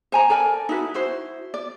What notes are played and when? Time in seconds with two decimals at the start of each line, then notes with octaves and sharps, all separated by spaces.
0.12 C5 G#5 A#5
0.30 A4 A#4 D5 G#5
0.69 D#4 E4 F#4 B4
0.94 E4 F#4 C5
1.54 D5